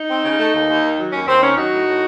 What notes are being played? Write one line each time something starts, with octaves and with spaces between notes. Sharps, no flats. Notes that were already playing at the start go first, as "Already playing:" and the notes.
Already playing: D#4
C4
C#3
A3
D#2
D#2
D#3
F#3
D#2 C#4
D#2 C4
D#3 C#4
F#3 D#4 F#4
A2
A2